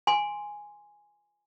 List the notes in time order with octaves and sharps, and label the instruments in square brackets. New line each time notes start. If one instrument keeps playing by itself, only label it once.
[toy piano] G#5 C6